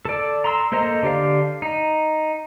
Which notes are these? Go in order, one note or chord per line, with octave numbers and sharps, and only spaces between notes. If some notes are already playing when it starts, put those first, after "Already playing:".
A4 D5
A#5 C6 E6
A#3 A4 C5 D#5 A#5
D3 G4 D5 F5
D#4